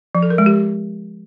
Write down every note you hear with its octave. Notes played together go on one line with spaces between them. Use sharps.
F3
A4
A#4
G#3
G4